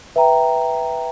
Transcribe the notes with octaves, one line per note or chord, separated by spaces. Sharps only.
B4 E5 G5 A#5